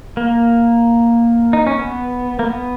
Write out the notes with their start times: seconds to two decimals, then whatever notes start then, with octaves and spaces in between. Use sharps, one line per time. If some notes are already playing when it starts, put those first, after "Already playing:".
0.17 A#3
1.53 D#4
1.67 C#4
1.79 B3
2.39 A#3
2.46 B3